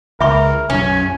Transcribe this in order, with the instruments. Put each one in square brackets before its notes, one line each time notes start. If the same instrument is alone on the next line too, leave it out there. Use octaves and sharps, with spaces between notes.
[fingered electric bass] C#2 [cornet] A#4 [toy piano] E5 B5 C#6
[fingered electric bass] B1 F#2 [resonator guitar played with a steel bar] C#4 [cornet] G#5